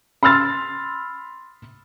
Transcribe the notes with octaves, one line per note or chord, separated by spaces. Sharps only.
B5 C6 E6 F6 A6